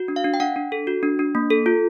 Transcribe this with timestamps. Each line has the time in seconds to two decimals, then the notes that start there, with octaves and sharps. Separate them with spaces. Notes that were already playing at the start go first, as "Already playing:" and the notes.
Already playing: F#4
0.08 D4
0.16 F5
0.24 D4
0.34 G5
0.40 D4 F#5
0.56 D4
0.72 A4
0.87 F#4
1.03 D4
1.19 D4
1.35 A#3
1.50 A4
1.66 F4